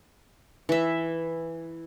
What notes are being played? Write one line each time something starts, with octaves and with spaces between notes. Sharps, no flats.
E3 E5